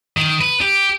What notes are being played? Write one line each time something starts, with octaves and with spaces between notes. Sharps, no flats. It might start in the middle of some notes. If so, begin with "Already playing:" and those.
D#3
B4
G4